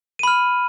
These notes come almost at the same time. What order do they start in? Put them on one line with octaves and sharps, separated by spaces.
D#7 B5 F6